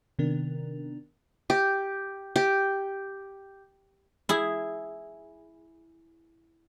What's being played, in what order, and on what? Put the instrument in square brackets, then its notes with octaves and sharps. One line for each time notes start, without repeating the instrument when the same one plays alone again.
[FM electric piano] C3 D#3 B3 D4 A#4
[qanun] G4
G4
[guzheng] E4 G#4